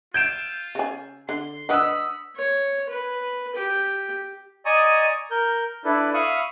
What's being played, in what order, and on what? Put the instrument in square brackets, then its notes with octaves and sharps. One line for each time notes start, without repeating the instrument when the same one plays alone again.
[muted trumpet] F4 [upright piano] G6 D7 E7
[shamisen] C#3 G#5
[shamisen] D3 [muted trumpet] C6
[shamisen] D4 B4 D#5 [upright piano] F#5 D#6 E6 [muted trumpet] B5
[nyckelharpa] C#5
B4
G4
[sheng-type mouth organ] D5 D#5 G#5 A#5 C#6 D#6
A#4 G6
D4 E4 A4 B4
E5 F5 B5 C#6 D#6